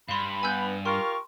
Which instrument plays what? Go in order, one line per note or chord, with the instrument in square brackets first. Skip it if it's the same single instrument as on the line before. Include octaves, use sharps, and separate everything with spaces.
[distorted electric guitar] G2 [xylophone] F5 C6 [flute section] B5
[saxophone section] B3 [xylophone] G#5 E6 G6
[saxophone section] F4 G4 A#4 [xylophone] C6 [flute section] C#6